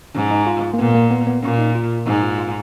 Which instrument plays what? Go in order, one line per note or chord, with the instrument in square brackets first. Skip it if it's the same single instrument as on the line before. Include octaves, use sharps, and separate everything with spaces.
[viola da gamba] G#2 [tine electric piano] C#4
[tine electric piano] D#4
F4
A#3
[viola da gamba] A#2 [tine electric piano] B3
[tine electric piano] A#3
B3
B3
[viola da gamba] A#2 [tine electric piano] C#4
[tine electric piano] D#4
F4
[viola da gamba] G#2 [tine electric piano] D#4
[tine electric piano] F4
F4